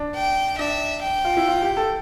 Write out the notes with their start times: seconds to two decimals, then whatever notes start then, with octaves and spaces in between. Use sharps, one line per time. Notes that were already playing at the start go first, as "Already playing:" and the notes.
Already playing: D4
0.15 G5
0.59 D4 E5
1.03 G5
1.25 F4
1.37 E4
1.48 F4
1.62 G4
1.77 A4